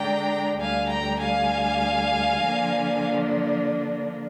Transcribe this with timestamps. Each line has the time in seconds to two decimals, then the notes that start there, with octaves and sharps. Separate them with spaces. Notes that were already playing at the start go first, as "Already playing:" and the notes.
Already playing: D3 G#3 D4 G5 A#5
0.59 D2 D3 G3 F5 G#5
0.89 G5 A#5
1.19 F5 G#5
2.39 D3 F3 A#3 D4